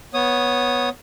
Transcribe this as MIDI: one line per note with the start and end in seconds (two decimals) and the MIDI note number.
0.14 0.89 59
0.14 0.89 73
0.14 0.89 87